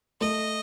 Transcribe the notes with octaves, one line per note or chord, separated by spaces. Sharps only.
A3 D#5